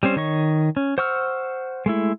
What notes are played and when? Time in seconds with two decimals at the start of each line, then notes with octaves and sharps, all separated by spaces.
0.03 G3 C4 C#4 C5
0.16 D#3 C#5 D#5 C#6
0.77 C#4
0.98 C5 F#5 C#6 E6 F6
1.86 G#3 A3 E4